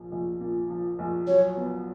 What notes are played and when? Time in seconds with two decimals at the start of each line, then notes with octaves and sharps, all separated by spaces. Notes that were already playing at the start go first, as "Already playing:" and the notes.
Already playing: A#1 F3
0.12 A#1
0.41 A#2
0.70 F3
0.99 A#1
1.27 F#3 C#5
1.57 B3